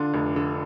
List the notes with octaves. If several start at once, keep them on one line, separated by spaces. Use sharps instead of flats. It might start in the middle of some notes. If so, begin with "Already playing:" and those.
Already playing: D3 D4 F4
F1
D3